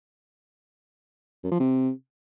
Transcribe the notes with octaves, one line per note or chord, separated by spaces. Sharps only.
F#2
F3
C3